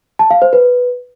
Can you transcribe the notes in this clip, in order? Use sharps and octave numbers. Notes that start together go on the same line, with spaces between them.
A5
F5
C5
B4